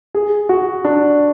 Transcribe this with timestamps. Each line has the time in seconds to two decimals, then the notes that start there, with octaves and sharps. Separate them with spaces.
0.14 G#4
0.49 F#4
0.85 D4